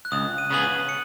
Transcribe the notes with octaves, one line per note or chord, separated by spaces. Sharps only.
F#6
C#2 D#6
D#7
C#3 B3 G#4 F#7
D#7
C#7